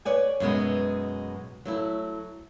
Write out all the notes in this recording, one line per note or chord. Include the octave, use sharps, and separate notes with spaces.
B4 C#5 D5 G#5
F#2 B2 G#3 B3
F#3 A3 E4